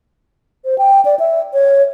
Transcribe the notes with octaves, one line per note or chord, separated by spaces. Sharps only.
C5
G5
D5
E5
C#5